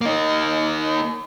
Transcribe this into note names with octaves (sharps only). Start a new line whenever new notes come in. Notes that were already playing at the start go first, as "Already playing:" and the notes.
A#3 D#4